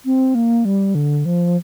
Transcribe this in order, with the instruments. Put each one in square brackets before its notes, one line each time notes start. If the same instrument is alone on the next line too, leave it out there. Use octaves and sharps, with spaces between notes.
[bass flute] C4
A#3
G3
D3
F3